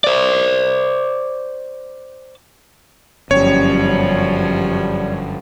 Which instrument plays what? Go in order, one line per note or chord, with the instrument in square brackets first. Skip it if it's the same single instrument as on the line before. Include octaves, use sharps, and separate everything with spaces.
[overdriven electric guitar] C5 D5
[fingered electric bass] G1 C#4 [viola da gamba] F#2 F3 [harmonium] G3 [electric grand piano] C#5